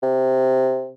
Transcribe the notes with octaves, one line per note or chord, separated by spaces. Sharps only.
C3